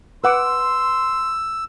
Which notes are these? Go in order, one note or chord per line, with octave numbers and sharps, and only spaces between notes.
B4 F#5 C6 D6 E6